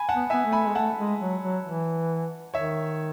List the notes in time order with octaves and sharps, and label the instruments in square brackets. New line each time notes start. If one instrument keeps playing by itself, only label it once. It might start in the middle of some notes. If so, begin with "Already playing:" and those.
Already playing: [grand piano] G#5 B5
F#5 A5
[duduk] B3
[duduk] B3 [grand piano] E5 G#5
[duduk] A3
[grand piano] G#5 B5
[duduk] G#3
[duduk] A3 [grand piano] F#5 A5
[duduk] G#3
F#3
F#3
E3
[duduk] D#3 [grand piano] C#5 E5